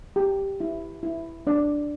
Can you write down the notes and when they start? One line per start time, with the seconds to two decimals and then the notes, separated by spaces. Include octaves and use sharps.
0.16 G4
0.60 E4
1.03 E4
1.47 D4 D5